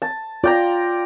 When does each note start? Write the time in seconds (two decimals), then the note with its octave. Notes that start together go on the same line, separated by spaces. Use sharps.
0.02 A5
0.44 F4 D5 G5 A#5